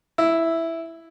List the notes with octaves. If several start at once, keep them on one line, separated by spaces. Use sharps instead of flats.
E4